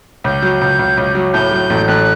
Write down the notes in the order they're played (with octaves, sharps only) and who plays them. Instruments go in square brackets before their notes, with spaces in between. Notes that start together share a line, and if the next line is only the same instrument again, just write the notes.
[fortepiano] C#2 [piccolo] G6
[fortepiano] F#3
C#2
C#2
C#2
F#3
[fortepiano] A2 [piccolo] G6
[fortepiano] F#3
A1
[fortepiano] A1 [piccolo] F#6